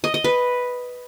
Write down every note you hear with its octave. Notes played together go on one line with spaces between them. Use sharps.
D#5
D#5
B4